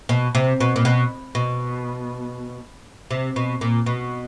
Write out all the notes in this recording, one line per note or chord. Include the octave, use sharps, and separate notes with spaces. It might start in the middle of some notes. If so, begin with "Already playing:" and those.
B2
C3
B2
A#2
B2
B2
C3
B2
A#2
B2